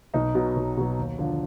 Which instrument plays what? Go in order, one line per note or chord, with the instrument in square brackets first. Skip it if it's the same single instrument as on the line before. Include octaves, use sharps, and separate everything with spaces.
[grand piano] B1 D#4
B2 F#3
B1
B2 F#3
D#2
D3 F3